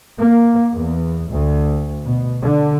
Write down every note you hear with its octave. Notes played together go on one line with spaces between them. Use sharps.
A#3
E2
D2
B2
D3